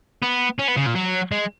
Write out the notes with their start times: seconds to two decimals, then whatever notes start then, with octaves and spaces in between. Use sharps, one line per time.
0.23 B3
0.59 C#4
0.68 B3
0.77 C#3
0.87 A#2
0.95 F#3
1.32 G#3